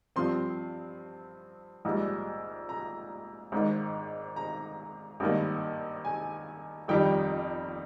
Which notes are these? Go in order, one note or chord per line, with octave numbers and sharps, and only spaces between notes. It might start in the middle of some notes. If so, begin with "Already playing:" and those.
G2 F3 C4 C6
A#1 G#2 G3
A#5
G#1 G#2 D#3
A#5
G#1 G2 D#3 A#3
G#5
G1 F2 D#3 G3 G5